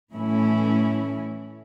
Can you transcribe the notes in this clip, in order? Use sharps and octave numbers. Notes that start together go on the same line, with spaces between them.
A2 E3 A3 C#4 E4